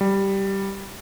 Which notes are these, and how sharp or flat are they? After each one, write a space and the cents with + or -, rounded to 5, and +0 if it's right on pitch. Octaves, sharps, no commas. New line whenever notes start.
G3 -5